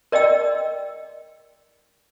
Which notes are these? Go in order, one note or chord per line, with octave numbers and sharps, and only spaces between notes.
A#4 D5 D#5 G5 E6